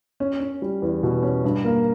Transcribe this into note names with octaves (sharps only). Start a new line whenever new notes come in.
C#4
C#4
G3
E2
B2
C#4
G2
A#3